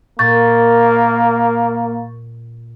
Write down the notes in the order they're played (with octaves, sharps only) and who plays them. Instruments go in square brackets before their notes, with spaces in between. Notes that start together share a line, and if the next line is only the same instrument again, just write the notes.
[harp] A#2 [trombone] A#3 [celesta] C#6 G6 A6